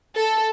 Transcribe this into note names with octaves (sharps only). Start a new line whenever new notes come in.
A4